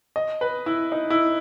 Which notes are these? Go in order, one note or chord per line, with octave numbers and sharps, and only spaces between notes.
D#5
B4
E4
D#4
E4